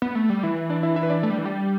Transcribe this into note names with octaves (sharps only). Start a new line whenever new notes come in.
B3
A3
G3
E3 E4 E5
D4 D5
E4 E5
E4 E5
B4
D4 D5
A3
G3
E3
G3